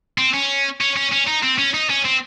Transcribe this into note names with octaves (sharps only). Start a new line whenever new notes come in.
C4
C#4
C#4
C#4
C#4
D#4
C4
C#4
D#4
C#4
C4